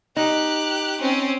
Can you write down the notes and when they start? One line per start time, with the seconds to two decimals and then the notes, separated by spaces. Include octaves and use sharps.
0.17 D#4 G4 F#6
1.01 C4 C#4